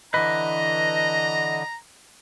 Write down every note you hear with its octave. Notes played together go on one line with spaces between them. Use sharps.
D3 E3 B4 D#5 A#5